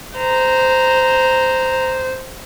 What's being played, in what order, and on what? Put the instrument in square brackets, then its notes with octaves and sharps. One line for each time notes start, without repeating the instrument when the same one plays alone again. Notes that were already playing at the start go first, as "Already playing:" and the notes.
[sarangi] C5 [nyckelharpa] A#5